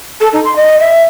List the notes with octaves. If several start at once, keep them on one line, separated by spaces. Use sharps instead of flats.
A4
D#4
C6
D#5
E5